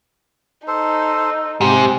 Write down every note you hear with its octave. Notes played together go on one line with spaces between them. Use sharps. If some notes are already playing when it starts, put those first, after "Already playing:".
D#4 A4 C5
G#2 C3 G4 C5